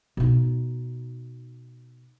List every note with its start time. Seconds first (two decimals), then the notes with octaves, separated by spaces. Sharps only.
0.17 B2 D#4